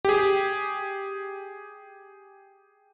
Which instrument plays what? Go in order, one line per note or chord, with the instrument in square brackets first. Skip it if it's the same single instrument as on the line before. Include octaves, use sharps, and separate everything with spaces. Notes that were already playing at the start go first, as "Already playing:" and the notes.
[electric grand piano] G4 G#4